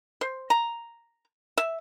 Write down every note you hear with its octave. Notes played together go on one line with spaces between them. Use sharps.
C5
A#5
E5